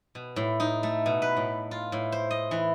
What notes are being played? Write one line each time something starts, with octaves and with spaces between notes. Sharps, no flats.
B2
A2
D#4
A3
B2
B4
A2
F4
A2
C5
D#5
E3